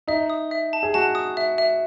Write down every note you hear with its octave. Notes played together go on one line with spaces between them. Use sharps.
D#4 E5
D#6
E5
A5
G#4
F#4 A5
D#6
E5
E5